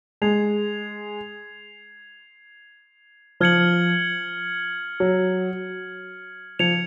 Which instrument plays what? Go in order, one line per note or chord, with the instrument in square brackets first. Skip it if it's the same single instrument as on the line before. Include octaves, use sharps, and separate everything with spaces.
[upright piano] G#3 [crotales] G#6 C7 F7
[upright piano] F3 [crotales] F6 G#6 C#7 F#7
[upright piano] F#3
[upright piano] F3 [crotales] G#6 C#7 F7